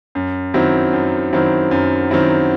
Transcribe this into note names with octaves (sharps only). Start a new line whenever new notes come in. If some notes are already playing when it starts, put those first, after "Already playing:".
F#2
D#3 F#3 C4 E4
F#2
D#3 F#3 C4 E4
F#2
D#3 F#3 C4 E4